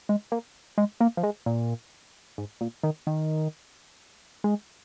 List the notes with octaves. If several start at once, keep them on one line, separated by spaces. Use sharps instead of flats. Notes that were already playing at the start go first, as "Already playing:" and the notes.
G#3
A#3
G#3
A#3
F3
G#3
A#2
G#2
A#2
D#3
D#3
G#3